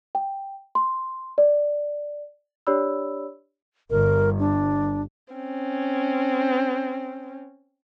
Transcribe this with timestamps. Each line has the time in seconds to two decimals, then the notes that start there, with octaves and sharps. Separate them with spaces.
0.15 G5
0.75 C6
1.38 D5
2.67 D4 G4 C#5 D5 B5 E6
3.90 G1 A#4
4.39 D4
5.34 C4 C#4